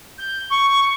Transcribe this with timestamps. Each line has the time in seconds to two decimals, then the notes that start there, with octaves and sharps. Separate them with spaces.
0.18 G6
0.50 C#6